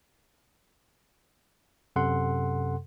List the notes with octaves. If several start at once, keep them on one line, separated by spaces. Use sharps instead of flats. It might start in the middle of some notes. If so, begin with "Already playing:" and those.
F#2 C3 A4 F#5 C6